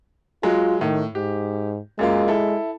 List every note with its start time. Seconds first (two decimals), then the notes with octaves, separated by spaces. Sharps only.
0.43 F#3 G#3 F4
0.81 A2 D#3
1.15 G#2 G4
1.99 F#2 G#3 A#3 F4
2.28 E4 A4